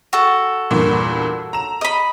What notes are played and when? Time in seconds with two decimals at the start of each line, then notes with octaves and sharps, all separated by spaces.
0.13 F#4 A4
0.71 E2 G2 A#2
1.53 A#5 E7
1.81 D#5 B5